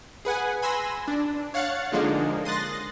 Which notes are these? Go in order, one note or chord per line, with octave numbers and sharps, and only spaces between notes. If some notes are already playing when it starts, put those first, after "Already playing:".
G#4 B4 F#5 G#5
G#5 B5 C6 E6 A#6
D4
C#5 F5 F#5 F#6 A6 C#7
D3 F3 G#3 A#3 D4 D#4
C6 D#6 F#6 A6 A#6